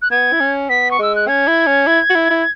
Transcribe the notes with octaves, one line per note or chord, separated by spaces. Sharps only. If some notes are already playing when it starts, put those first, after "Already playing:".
F#6
B3 G#6
E4
C#4
B3 B6
C#6
G#3 E6
F#6
C#4 G#6
E4
C#4
E4
F#4
E4
E4